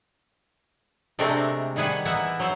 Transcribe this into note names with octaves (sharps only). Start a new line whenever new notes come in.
C3 G#3 A3 C4 D4 A#4
D#3 G3 G#4 B4 F#5
E3 A#3 B3 E5 F#5
F#3 C5 E5